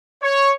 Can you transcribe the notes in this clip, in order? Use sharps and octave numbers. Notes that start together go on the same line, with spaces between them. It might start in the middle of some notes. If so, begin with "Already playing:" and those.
C#5